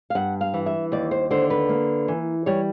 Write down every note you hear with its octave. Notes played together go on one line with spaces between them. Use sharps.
F5
G2 F#5
F5
E3
E5
D#2 D5
C5
D3 C5
B4
A#3
E3
G3 C#5